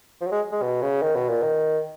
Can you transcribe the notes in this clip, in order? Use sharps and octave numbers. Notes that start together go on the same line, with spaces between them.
F3
F#3
G#3
G#3
B2
C#3
D#3
B2
A#2
D#3